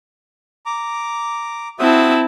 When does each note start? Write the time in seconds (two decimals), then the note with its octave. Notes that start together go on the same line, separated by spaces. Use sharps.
0.66 A#5 D6
1.79 C4 E4 F#4 E5 A5 D#6